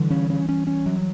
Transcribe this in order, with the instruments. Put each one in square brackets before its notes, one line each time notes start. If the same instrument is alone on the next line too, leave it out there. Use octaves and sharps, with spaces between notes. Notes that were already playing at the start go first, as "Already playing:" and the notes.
Already playing: [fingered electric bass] D3 [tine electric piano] E3 G3
[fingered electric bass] C#4
C#4
C#4
C#4
F#3